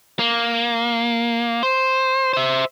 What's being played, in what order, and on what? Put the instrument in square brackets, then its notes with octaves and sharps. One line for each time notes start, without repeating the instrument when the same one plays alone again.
[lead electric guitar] A#3
C5
C5 E5